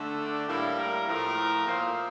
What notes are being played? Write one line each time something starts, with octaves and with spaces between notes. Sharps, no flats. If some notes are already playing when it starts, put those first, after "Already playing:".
Already playing: D3 A3
D4
A2 G3 A#3 E4
A#4
A2 F3 A3 A#4
A#2 F3 A#3 C5